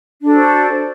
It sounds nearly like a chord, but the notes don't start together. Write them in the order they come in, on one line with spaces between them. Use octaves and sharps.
D4 A4 F#4 C5